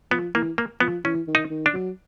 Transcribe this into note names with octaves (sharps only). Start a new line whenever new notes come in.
F3 B3
E3 A#3
A#3
F3 B3
E3 C#4
D#3
D#4
D#3
D4
F#3